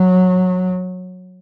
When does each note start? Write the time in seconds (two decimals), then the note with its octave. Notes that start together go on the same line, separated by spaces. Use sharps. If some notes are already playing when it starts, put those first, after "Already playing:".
Already playing: F#3